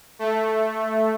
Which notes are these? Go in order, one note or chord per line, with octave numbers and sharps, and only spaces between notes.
A3